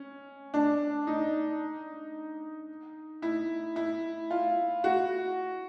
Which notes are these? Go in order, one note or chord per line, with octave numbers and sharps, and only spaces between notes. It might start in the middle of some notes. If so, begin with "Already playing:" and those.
Already playing: C#4
D4
D#4
E4
E4
F4
F#4